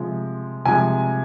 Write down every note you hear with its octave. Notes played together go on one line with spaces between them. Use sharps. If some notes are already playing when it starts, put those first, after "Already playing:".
Already playing: C3 F3 G#3
C3 F3 G#3 G#5